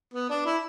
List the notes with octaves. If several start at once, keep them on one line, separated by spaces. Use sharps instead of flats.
B3
D4
E4